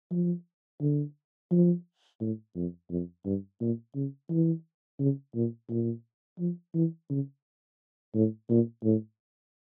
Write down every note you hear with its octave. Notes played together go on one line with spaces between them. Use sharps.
F3
D3
F3
A2
F2
F2
G2
A#2
C#3
E3
C#3
A#2
A#2
F3
E3
C#3
A2
A#2
A2